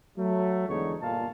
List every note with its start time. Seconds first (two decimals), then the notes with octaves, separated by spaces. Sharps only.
0.18 F#3 A3
0.69 E2 D3 G#3 D#4 C#5
1.02 G1 A#2 A4 F5 A5